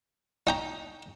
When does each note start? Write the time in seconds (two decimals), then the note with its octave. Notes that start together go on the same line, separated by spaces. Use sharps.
0.47 D#4 G5 A#5